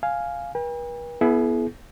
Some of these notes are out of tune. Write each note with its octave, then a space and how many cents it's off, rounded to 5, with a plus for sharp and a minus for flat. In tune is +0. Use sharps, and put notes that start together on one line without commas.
F5 +0 G#5 +0
B4 -45 G5 +45
B3 -10 E4 +10 G#4 +40